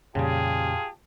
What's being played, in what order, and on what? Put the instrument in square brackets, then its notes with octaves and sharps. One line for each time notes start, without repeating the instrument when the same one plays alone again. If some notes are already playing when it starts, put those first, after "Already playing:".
[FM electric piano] F2 A#2 [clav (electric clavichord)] C#3 G3 [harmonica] F4 G4 A5 [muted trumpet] G#4